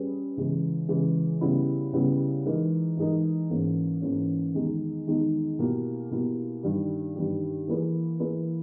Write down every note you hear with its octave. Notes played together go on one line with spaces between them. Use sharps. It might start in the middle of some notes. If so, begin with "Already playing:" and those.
Already playing: G3 C#4 G#4 B4
C#3 E3 G#3
C#3 E3 G#3
C#3 G3 B3 E4
C#3 G3 B3 E4
E3 G#3 D#4 A#4
E3 G#3 D#4 A#4
G#2 E3 A#3 C#4
G#2 E3 A#3 C#4
E2 D#3 G#3 D#4
E2 D#3 G#3 D#4
B2 A#3 E4 G4
B2 A#3 E4 G4
G2 D#3 G3
G2 D#3 G3
E3 A#3 E4 G#4 B4
E3 A#3 E4 G#4 B4